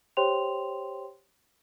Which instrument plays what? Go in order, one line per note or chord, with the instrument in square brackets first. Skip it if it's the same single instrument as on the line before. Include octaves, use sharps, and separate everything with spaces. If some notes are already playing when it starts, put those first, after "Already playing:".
[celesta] G4 C5 C#5 G5 C6 F7